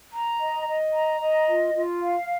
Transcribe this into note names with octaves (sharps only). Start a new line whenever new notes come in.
A#5
D#5
D#5
A#5
D#5
F4
F4
F5